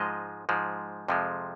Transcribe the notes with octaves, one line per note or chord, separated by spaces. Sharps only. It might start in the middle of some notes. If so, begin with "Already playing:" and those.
Already playing: G#2 F3 G#3 D#5
G#2 F3 G#3
F2 C3 F3 G#3